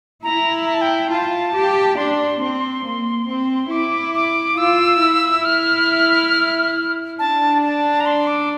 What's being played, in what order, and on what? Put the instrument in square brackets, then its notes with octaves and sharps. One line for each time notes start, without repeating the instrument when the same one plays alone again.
[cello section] E4 [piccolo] A#5
[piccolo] A#5
A5
G5
[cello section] F4 [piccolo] A5
[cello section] G4
[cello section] D4 [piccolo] C6
[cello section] C4
A#3
C4
[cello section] E4 [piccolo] D6
[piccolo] D6
[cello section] F4 [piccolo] E6
[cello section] E4
[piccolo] F6
[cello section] D4 [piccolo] A5
[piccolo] A5
A#5
C6
D6